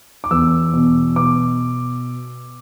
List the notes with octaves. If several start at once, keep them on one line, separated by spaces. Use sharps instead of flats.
D6
E2 E6
B2
B2 D6